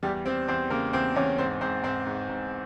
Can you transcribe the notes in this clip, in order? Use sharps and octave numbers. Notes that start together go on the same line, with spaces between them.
E2 G3 G4
G3 C4 C5
E2 C4 C5
C#3 A#3 A#4
E2 C4 C5
E2 C#4 C#5
G#2 C4 C5
G#2 C4 C5
G#2 C4 C5
G#2
G#2